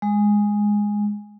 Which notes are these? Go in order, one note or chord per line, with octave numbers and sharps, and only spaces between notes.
G#3